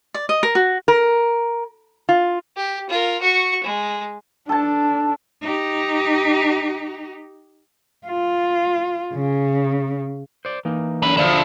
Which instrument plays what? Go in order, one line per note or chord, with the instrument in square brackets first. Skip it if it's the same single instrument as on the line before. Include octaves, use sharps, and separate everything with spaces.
[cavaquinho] D5
D#5
A#4
F#4
[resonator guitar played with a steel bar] A#4
F4
[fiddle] G4
F4 A#4
F#4 C#6
G#3
[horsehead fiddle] D4 [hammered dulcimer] A4 A5
[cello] D#4 G4
F4
C#3
[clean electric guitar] C5 D5
E3 A#3 D#4
[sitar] F#2 [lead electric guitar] D3 B4
[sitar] D3 F3 [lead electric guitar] E4 F4